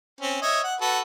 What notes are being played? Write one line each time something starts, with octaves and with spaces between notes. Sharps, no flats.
C4 C#4
C#5 D#5 E5
F#5
F#4 A4 B4